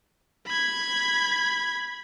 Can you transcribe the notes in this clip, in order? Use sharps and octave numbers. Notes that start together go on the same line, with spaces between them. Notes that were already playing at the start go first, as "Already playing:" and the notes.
B5 G#6